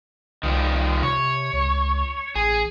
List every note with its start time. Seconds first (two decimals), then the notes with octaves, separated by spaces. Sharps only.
0.43 C2 D#3 F3 G3
1.03 C3 C#5
1.53 C#2
2.36 A1 G#4